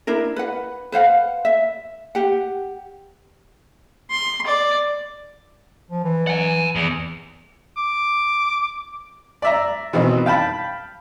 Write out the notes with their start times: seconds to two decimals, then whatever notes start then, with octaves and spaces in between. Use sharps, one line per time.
0.07 D4 E4 A#4
0.36 B4 F#5
0.92 B4 C5 F5 F#5
1.45 E5
2.15 G4 F#5
4.10 C6
4.47 D5
5.91 F3
6.04 E3
6.27 F#5 G#5
6.75 E2
7.77 D6
9.42 D5 E5 A#5
9.93 B2 D#3 E3 C4
10.26 F5 G5 A5 B5